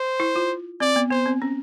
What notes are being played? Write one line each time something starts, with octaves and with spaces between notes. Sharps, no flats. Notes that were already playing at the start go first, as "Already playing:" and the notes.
Already playing: C5
E4
F4
C4 D5
B3
B3 C5
C4
C#4